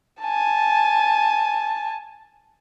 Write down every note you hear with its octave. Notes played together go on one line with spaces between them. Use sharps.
G#5 A5